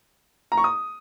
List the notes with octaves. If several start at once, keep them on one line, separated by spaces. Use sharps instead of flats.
A#5
C#6
D#6